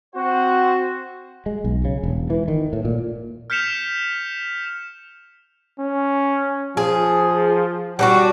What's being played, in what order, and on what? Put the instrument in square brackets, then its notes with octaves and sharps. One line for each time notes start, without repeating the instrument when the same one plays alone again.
[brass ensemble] C4 F#4 C5
[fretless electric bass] G#3
B1
C#3
E1
E3
D#3
A2
A#2
[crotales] F6 G6 B6 C#7 E7 F7
[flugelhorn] C#4
[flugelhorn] F3 [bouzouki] G#4
[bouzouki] G3 D4 F#4 [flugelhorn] F#5